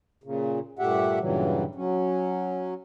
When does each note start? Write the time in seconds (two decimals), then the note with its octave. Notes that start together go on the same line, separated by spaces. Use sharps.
0.24 A#2 C#3
0.79 G2 A#2 A3 G4 E5 F#5
1.20 G2 A#2 C#3 E3 F#3 G3
1.75 F#3 C#4